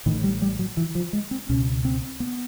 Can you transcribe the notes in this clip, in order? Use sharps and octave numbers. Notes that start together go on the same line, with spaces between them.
A1 A2 D#3
G3
G3
F#3
E3
F3
G#3
C4
C#2 B2 C#4
C4
B3